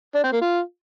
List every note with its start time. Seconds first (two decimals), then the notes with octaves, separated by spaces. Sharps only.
0.15 D4
0.24 C4
0.33 A#3
0.41 F4